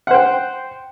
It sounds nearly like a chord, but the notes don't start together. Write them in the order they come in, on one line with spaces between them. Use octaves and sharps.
F#5 C5 G5